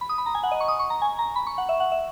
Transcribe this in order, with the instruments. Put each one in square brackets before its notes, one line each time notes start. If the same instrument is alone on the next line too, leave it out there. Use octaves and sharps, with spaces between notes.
[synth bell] B5
D#6
B5
A#5
G#5
F#5
D#5
C#6
D#6
C#6
A#5
G#5
A#5
B5
C#6
F#5
E5
F#5
E5